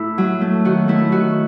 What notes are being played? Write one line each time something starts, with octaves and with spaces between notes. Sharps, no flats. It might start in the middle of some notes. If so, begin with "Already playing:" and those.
Already playing: A2 E4
F#3
A3
D#3 F#4
A3 E4
D#3 F#4